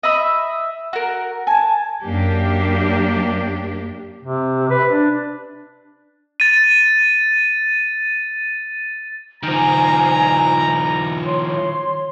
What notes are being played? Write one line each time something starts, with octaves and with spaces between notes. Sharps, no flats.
D#5 E5 B5
F#4 A#4
G#5 A5
F#2 A#3 D4 G4
C3
B4
D4
A6 D#7
D#3 F3 C5 G#5 A#5
C#5 C6